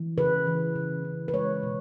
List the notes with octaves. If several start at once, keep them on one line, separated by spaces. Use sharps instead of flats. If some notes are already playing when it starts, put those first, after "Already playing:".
Already playing: E3
C#3 B4
E3
C#3
C#3
B4
G#3 C#5
B2